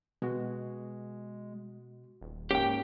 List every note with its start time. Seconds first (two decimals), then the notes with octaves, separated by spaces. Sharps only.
0.22 B2 G#3 F#4
2.21 D#1
2.51 G#2 A#3 C#4 G4 G5